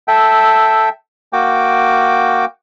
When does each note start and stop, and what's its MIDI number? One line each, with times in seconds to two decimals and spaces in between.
0.08 0.89 69
0.08 0.89 76
0.08 0.89 79
1.33 2.45 58
1.33 2.45 66
1.33 2.45 79
1.33 2.45 86